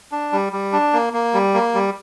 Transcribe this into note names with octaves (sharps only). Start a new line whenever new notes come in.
D4
G3
G3
D4
A#3
A#3
G3
A#3
G3